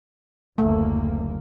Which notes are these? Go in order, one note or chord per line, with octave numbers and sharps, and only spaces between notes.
F#1 D2 A3 A#3